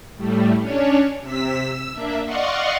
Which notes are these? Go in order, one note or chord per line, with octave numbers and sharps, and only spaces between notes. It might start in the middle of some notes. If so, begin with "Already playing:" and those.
A2 G3 A3
C#4 D4 C#5
C3 E6 B6
E6
A#3 D4 E5
D5 D#5 F5 F#5 C6 C#6